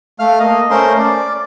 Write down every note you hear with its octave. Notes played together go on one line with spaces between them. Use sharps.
A3 F5 F6
A#3 D#5
A3 C#4 A#4 C5 C6
D5